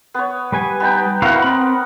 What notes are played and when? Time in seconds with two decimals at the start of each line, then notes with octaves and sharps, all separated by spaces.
0.14 B3 C#5
0.52 G3 B4 G#5
0.80 B3 D#4 G5
1.22 B3 E4 F#4 A#4 F5 F#5
1.42 C4 B5